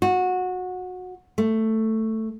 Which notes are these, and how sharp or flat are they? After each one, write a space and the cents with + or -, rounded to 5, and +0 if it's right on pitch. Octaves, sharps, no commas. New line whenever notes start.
F#4 -20
A3 +10